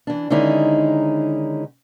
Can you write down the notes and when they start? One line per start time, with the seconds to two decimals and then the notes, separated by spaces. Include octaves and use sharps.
0.07 E3 D4
0.30 D3 D#3 G#3 C#4 D#4 E4